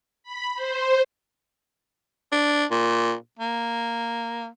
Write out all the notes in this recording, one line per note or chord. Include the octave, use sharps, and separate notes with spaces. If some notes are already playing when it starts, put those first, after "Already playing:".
B5
C5
D4
A#2
A#3